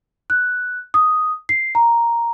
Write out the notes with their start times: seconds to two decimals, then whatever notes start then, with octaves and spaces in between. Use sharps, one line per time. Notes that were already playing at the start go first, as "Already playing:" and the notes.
0.30 F#6
0.94 D#6
1.49 C7
1.75 A#5